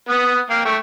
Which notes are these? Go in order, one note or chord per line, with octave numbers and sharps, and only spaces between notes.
B3 F#5 D#6
A#3 F5 G5
A3 G5 C#6